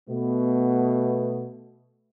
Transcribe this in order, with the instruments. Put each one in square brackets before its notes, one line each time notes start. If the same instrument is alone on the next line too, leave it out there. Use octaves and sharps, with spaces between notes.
[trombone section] B2 A3 B3